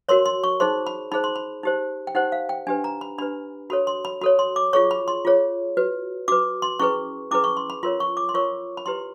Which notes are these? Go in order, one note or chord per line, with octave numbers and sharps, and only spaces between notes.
F#4 A#4 C#5 C6
C6
C#6
D#4 G#4 C5 C6
B5
D#4 G#4 C5 B5
C6
B5
D#4 G4 C5
G5
D#4 G4 C5 F#5
F5
G5
D4 G4 B4 G#5
A#5
B5
D4 G4 B4 B5
F#4 A4 C#5 B5
C6
B5
F#4 A4 C#5 B5
C6
D6
F4 G#4 C#5 C#6
B5
C6
F4 G#4 C#5
F#4 B4
F#4 B4 D6
C6
C#4 E4 G#4 B4 C#6
C#4 E4 G#4 B4 D6
C#6
C6
B5
F4 A#4 C#5 C6
C#6
D6
C6
F4 A#4 C#5 C#6
B5
E4 G4 B4 C6